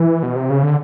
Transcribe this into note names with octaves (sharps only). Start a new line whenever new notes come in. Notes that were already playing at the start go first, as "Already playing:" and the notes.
Already playing: E3
B2
C3
C#3
D3